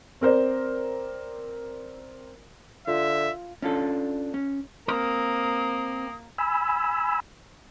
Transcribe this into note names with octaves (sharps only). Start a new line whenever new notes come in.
C4 A#4 C5 D5
D3 F4 E5
C#4 D4 F4 A4
C#4
A#3 C4 A#4 D#6
G#5 B5 E6